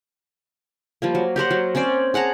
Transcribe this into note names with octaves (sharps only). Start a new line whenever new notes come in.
F3 G3 A#3
F#3
G4 A#4 C5 F#5
F#3
C4 C#4 C5 D5
G#4 F#5 A5 A#5